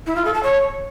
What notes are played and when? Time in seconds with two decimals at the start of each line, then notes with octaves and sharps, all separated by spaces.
0.07 E4
0.16 F4
0.25 A4
0.34 A5
0.43 C#5